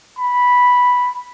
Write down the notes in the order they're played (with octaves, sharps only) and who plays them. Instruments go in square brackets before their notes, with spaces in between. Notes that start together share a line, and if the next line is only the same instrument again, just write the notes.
[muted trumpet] B5